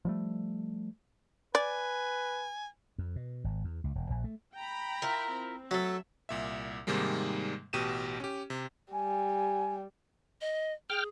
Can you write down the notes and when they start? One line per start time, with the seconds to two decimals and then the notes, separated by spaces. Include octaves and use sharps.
0.05 F3 G3 A3
1.55 B4 D5 G#5
2.98 F2
3.16 B2
3.44 G#1
3.64 E2
3.84 C#2
3.95 E1
4.10 A#1
4.24 A3
4.55 G5 A#5 B5
5.02 E4 F4 A#4
5.33 C4
5.71 F#3 A3 A4 E5
6.29 C2 A#2 E5
6.87 G#2 C3 D#3 G3 G#3 A#3
7.73 A1 B2 G4 D#7 E7
8.20 C#4 G4
8.50 C3
8.93 G3 G#5
10.41 D#5
10.90 G#4 G5 F6